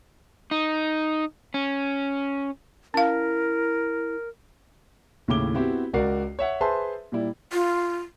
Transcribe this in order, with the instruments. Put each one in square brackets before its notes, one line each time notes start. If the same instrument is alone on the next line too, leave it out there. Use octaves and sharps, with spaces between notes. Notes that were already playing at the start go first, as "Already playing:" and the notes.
[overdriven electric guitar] D#4
C#4
[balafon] C#4 F5 [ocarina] E4 [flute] A#4
[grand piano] D#2 A2 C#3 E4 D6 G7
B3 C4 E4 F#4 G4
C#2 F#4 A#4 D5 C7
C#5 E5 F#5
G#4 B4 C5 E5 A5 C6
A#2 G3 E4
[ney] F4